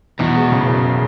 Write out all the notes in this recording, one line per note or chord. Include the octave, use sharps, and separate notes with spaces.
E2 B2
G#3
C#3
F#1